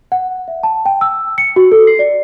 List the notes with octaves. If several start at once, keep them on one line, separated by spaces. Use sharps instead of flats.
F#5
E5
A5
G5
E6
C#7
F#4
A4
C7
D5